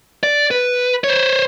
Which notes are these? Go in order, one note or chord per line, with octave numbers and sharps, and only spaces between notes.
D5
B4
C5 C#5